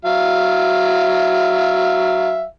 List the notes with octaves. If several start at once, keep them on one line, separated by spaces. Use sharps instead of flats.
F#3 E5 F5